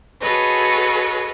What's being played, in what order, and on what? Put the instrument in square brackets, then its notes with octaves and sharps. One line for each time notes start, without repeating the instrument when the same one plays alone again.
[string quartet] F#4 G#4 A4 B4 C#5 D#5